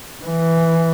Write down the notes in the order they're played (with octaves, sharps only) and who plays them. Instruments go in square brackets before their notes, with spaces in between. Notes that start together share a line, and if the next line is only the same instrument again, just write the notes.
[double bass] E3